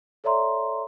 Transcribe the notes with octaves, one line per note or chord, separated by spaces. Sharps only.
A4 C#5 D5 E5 A#5 C6